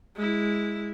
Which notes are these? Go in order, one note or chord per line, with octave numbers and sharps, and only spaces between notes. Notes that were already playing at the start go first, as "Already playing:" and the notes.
G#3 E4